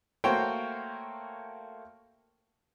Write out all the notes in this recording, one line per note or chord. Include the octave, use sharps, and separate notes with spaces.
A3 A#3 F#4 C5 C#5 G5